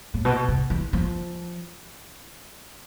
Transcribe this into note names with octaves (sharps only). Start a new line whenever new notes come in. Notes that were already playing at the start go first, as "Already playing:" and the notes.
A2
B2
C3
E3
F3